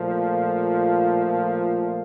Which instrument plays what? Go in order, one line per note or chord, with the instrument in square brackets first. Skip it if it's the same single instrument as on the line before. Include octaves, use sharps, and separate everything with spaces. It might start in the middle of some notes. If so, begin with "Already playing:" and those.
Already playing: [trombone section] A#2 F3 A3